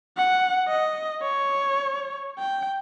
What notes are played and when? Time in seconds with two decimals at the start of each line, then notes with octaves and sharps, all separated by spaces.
0.17 F#5
0.68 D#5
1.22 C#5
2.39 G5